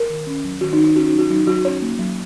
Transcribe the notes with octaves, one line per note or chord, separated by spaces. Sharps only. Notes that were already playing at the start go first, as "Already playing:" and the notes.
Already playing: A#4
D#3
C#4
F#3
D#3 F#4
D#4
D#3
D#4
C#4 F#4
D#4
F#3
F#4
F#3 D#4
F#3 F#4
C#4 C#5
A#3
F#3